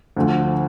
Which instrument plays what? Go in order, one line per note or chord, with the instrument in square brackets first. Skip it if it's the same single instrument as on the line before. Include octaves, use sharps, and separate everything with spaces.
[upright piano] D2 D3 F3